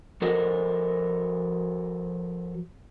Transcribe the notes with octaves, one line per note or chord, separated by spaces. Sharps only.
F3 F#4 A4 A#4 C5 D#5